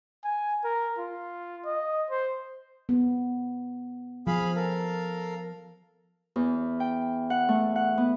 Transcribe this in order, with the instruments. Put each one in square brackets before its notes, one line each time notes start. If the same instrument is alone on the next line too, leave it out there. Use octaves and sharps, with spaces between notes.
[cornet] G#5
A#4
F4
D#5
C5
[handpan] B3
[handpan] F3 [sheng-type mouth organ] G#4 F5 B5
[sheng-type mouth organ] A4 A#4 F5
[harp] E2
G5
F#5
A3
F#5
B3